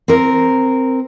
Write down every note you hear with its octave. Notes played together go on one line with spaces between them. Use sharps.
C4 A#4